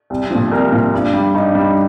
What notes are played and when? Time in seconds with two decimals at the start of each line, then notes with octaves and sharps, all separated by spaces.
0.10 C2
0.31 A#2 F3
0.51 C2 A#4
0.72 A#2 F3
0.94 G2
1.13 G3
1.34 G2 D#4
1.55 G3